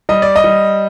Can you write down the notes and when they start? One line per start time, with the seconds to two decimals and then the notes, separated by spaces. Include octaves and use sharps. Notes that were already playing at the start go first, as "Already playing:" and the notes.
0.09 G3 D#5
0.22 D5
0.36 D#5
0.44 G3